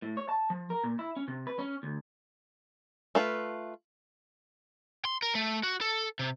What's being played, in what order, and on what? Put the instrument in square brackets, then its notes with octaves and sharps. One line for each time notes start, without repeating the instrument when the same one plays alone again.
[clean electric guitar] A2
C#5
A5
F3
A#4
A#2
E4
C#4
C3
B4
C#4
D2
[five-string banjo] A3 F4 B4
[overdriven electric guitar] C6
A#4
A3
F#4
A4
C3